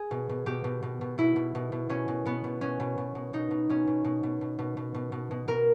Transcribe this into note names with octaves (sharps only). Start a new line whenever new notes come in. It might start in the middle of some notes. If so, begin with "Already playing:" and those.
Already playing: G#4
B2
B2
B2 G4
B2
B2
B2
B2 E4
B2
B2
B2
B2 C#4
B2
B2 B3
B2
B2 C#4
B2
B2
B2
B2 D#4
B2
B2 C#4
B2
B2
B2
B2
B2
B2
B2
B2
B2
B2 A#4